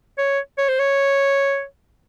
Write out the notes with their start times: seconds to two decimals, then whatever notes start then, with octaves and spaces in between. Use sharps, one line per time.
0.18 C#5
0.58 C#5
0.69 C5
0.79 C#5